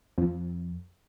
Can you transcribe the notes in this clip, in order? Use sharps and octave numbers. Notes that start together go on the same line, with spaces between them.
F2